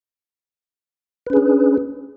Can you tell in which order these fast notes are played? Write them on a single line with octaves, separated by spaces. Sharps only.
B4 C#4 G#4 D4